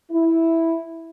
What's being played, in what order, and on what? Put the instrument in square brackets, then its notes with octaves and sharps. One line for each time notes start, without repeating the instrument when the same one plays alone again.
[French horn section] E4